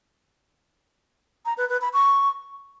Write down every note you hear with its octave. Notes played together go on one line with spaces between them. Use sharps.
A#5
B4
B4
B5
C#6